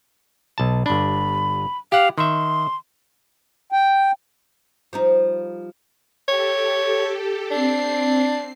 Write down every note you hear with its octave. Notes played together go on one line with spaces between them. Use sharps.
B1 A5
G1 D4 B5
G4 F5 F#5
D#3 E5 C6
G5
F3 G3 D#4
G4 A4 C#5
C4 D4 C7